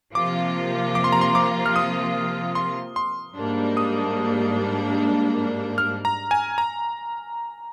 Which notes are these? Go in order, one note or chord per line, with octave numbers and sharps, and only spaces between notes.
C3 F3 A#3 F4 D6
D6
C6
A#5
C6
D6
F6
D#6
C6
C6
G#2 G3 A#3 D4
D#6
F6
A#5
G#5
A#5